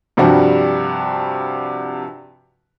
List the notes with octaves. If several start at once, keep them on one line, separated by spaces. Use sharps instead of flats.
G2 C3 F3 G3 F#4